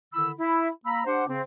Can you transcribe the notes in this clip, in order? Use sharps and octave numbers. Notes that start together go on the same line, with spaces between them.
D3 D#3 E4 B5 E6
E4
A#3 A#5 B5 E6
D4 G4 C5 F#5
C#3 C4